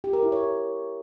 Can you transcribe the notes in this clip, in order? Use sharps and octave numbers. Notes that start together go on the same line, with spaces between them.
G4
A#4
E4
C#5